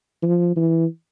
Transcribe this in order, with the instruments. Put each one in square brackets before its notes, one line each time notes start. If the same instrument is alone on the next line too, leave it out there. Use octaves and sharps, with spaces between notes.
[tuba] F3
E3